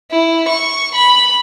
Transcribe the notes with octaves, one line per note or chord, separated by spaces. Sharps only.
E4
C#6
B5